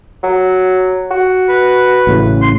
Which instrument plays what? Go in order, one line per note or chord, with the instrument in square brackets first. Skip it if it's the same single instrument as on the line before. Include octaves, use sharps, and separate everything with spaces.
[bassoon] F#3
F#4
[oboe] B4
[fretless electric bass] A1 A2 C#3
[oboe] C6